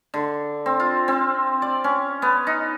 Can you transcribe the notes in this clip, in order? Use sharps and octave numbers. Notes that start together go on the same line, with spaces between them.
D3
C4
F4
C4
D5
C#4
B3
D#4